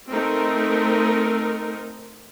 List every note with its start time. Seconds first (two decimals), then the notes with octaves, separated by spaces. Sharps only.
0.11 A3 C4 D#4 A#4